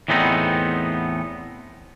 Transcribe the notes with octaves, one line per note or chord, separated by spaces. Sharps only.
E2 A2 B3 C4 D#4